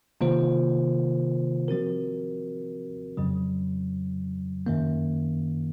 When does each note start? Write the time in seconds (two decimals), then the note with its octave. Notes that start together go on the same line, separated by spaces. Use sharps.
0.21 C3 D#3 A#3 F4 C5
1.68 F3 C4 F#4 A#4
3.17 F2 C#3 F#3
4.66 F#2 D#3 A#3